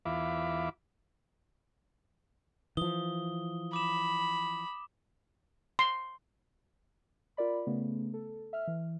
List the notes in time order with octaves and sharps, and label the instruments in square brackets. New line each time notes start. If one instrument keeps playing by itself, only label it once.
[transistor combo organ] E2 F4 E5 F5 B5 D6
[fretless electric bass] E3 F3 [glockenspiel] D#6 G7
[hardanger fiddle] B5 [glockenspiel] D6 E7
[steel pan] C6
[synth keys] F4 A#4 D5 B5
C#3 A3 B3
A4
E5 F6
E3